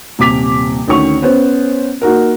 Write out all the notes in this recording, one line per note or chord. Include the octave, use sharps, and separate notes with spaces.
D#1 C3 D6 B6 F7
D2 D#3 C#4 C#6 F7
B3 C#4 C5
A#3 D#4 F#4 A#4